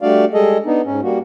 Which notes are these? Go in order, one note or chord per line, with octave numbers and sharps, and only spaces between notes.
G3 A3 D4 F#4 D5 F5
G3 G#3 G#4 A4 D#5
B3 D4 D#4
G#2 C#4
G3 A#3 F#4